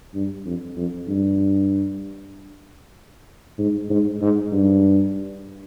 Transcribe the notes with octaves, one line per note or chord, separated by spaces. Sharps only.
G2
F2
F2
G2
G#2
G#2
G#2
G2